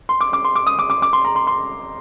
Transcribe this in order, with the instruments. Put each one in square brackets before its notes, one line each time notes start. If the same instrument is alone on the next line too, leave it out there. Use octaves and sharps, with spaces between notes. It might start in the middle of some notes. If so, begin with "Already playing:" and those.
[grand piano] C6
D6
D6
C6
D6
D#6
D6
D6
D6
C6
A#5
C6
C6